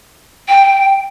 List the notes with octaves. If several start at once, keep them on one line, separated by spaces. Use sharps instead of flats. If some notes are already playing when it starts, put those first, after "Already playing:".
G5